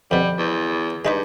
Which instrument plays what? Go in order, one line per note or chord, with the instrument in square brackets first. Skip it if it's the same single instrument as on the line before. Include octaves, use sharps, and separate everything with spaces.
[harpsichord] F2 B2 [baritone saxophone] G3
[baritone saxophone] E2
[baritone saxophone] G2 [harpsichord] G#3 D#4 B4